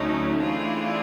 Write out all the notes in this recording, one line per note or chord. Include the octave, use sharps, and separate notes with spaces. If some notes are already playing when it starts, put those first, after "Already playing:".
Already playing: D2 D3 F#3 A3 C#4 D#4
E3 A3 C4 D4 E4 F4 G#4